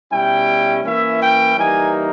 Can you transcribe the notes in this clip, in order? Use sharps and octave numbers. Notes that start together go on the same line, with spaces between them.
B2 G3 C#4 E4 G5
E3 A#3 C#4 E4 E5
G5
E3 G3 A#3 D#4 G#5